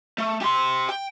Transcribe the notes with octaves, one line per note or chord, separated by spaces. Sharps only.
A3
G4 C6
G5